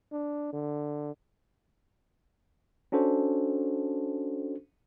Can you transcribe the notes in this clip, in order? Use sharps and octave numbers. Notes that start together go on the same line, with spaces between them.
D4
D3
C#4 D4 F#4 A4 C5